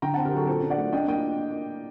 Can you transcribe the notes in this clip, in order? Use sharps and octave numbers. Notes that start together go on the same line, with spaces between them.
D3 G5 A#5
F#5 A5
C4
G4 A#4
F#3 F#4 A4
A#2 A4 C5
D4
D5 F#5
A3
D4 D#5 G5
A#3 D#5 G5